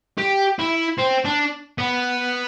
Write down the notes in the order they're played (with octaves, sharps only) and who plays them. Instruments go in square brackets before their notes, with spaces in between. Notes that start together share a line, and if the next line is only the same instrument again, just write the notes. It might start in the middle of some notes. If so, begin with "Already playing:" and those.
[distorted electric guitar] G4
E4
C4
D4
B3